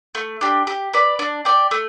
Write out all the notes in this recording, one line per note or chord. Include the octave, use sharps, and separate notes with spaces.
A3
D4 G4
G4
B4 D5
D4
G4 D5
A3